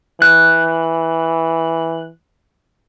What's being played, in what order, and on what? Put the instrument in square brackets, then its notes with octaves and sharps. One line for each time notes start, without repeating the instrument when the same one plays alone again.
[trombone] E3 [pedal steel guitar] F#6